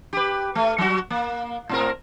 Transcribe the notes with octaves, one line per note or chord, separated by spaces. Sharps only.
G4 B4
A3
F#3 F#4
A#3
A2 C4 A#4